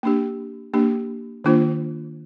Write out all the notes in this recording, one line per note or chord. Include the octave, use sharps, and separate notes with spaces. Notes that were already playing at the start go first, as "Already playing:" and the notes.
A#3 D4 G4
A#3 D4 G4
D#3 A#3 D4 F4 C5